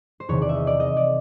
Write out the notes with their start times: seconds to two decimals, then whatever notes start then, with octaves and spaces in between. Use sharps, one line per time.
0.20 C5
0.29 E2 C3 D#3 C#5
0.42 D5
0.49 E5
0.54 D#5
0.67 D5
0.80 D#5
0.97 D5